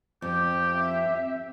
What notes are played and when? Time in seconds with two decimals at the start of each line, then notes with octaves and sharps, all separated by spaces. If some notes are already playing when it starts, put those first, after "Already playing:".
0.22 F2 G4
0.74 C4 E5